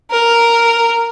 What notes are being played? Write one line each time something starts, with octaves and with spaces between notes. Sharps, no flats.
A#4